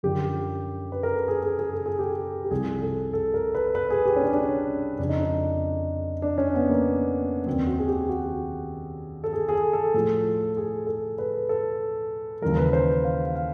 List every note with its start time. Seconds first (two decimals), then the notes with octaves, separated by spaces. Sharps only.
0.03 F#2 D3 F3 G4
0.92 B4
1.03 A#4
1.16 A4
1.28 G#4
1.43 G#4
1.59 G#4
1.73 A4
1.86 G#4
1.99 G4
2.10 G#4
2.44 G4
2.51 C2 C3 F3 G#4
2.82 A4
3.13 A4
3.34 A#4
3.55 B4
3.75 B4
3.90 G#4
4.06 G4
4.16 C#4
4.21 D4
4.32 D4
4.37 C#4
4.99 F2 C#3 F3 D4
5.09 D#4
5.19 D4
6.22 D4
6.38 C#4
6.54 B3
6.69 A#3
7.46 D#2 D#3 F#3 C4
7.67 F#4
7.78 G#4
7.88 G4
8.09 F#4
9.24 A4
9.33 G#4
9.49 G#4
9.53 A4
9.73 A4
9.94 A2 F3 A4
10.57 G#4
10.87 A4
11.18 B4
11.49 A4
12.42 D#2 C#3 E3 G3 A#4
12.57 B4
12.73 C5
13.04 F5
13.25 F5
13.36 F5